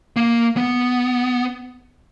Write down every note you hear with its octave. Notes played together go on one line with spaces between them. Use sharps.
A#3
B3